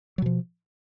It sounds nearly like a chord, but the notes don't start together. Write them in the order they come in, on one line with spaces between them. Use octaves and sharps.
F#3 B2 F3